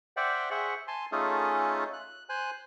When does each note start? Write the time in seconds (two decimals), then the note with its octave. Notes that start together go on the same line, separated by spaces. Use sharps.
0.17 C5 D5 E5 F#5 G5
0.51 G#4 C5 E5 F#5 C#6
0.88 G#5 A5 C6
1.12 A3 C#4 D#4 F4 G#4 A4
1.93 F#6
2.29 C5 G#5 F#6